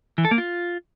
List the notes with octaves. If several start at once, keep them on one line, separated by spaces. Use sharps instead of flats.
E3
A4
A#3
F4